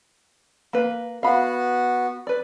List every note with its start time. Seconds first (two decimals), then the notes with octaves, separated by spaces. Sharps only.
0.73 A#3 B4
1.23 B3 F#4 F5 B5
2.27 B4 D5